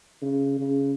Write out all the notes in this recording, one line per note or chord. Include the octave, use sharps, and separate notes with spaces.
C#3
C#3